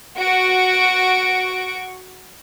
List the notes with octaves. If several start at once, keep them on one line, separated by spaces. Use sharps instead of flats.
F#4 C#6 D7